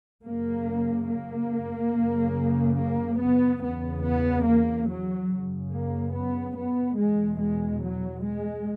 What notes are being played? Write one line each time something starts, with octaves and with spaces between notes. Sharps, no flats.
F#2 C#3 A#3
A#3
F#2 C#3
A#3
B3
E2 C#3 B3
B3
A#3
F#3
F#2 C#3
A#3
B3
B3
E2 B2 G#3
G#3
F#3
G#3